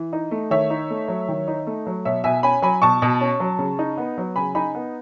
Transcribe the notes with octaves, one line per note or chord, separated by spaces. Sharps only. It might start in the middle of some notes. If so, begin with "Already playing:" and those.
Already playing: E3
D#4
A3
D#3 C#5 E5
D#4
A3
F#3
D#3
D#4
A3
F#3
B2 C#5 E5
B2 E5 G#5
C#4 G#5 B5
F#3 G#5 B5
B2 A5 C#6
B2
C#4
F#3
C#3
D#4
B3
F#3
C#3 G#5 B5
D#4 G#5 B5
B3